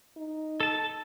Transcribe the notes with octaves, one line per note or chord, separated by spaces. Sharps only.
D#4
A4 A5